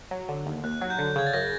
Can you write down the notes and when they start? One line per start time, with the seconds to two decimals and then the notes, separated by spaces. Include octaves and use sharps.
0.11 F#3
0.29 D3
0.46 D#2
0.64 D#2 F#6
0.81 F#3
0.90 G6
0.99 D3
1.16 C#3 G#6
1.27 A6
1.33 F#2 A#6